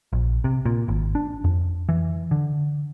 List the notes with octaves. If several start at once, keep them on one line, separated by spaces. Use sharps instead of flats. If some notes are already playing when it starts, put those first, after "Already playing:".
A#1
C3
A#2
G#1
D4
F2
E3
D3